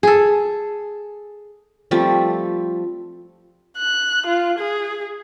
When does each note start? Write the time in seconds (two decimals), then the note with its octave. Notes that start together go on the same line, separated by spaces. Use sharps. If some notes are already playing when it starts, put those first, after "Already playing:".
0.03 G#4 A4
1.91 F3 G3 A3 C4
3.78 F#6
4.26 F4
4.58 G#4